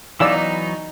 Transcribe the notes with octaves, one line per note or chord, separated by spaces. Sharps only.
E3 F#3 B3 D#4 D5 F5 E6